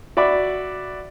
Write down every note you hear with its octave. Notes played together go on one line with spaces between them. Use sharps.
F#4 D5 E5 B5 D6